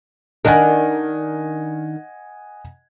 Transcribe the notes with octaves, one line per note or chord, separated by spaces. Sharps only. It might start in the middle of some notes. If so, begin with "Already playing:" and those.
D#3 D4 A#4 D#5 F#5 G#5